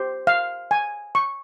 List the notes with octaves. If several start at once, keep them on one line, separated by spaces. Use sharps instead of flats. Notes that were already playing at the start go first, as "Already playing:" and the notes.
Already playing: G4 C5
F5
G#5
C#6